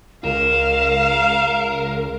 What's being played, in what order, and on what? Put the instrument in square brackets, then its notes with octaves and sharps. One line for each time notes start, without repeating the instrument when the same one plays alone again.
[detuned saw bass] C#2 [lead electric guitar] A#4 [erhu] F5 [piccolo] E7